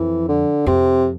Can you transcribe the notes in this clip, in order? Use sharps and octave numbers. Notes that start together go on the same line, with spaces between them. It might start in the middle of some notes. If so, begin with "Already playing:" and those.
Already playing: F2 E3
D3
F2 C3